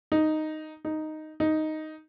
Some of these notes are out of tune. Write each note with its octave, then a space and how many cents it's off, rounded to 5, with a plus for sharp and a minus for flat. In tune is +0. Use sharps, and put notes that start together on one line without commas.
D#4 -5
D#4 -5
D#4 +0